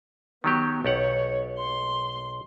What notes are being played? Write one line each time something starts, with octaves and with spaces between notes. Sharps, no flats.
D#3 F#3 B3 G4
B1 G4 C#5 F#5
C6